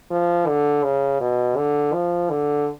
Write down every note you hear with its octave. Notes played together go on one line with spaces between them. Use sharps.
F3
D3
C#3
B2
D3
F3
D3